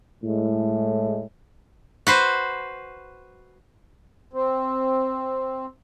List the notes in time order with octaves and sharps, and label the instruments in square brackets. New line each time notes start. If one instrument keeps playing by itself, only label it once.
[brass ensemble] A2 G#3
[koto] F#4 B4 C5
[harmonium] C4